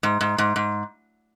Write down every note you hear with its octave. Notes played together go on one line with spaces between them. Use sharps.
G#2
G#2
G#2
G#2